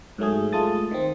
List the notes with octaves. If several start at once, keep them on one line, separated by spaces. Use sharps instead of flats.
G#2 F#3 A3 G#4
G#3 A3 F4 A4 D#6 A6
D#3 C4